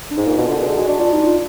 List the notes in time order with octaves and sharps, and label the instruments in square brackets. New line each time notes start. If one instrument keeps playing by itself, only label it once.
[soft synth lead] D4
[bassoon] G#2 [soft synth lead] D#4
[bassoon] A#2
[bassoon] B2 [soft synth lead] F4
[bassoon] D3
[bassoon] B2 [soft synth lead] G#4
[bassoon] D3
[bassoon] G#3 [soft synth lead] F#4
[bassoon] D4
[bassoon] D4 [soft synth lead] F4
[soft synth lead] D#4
F4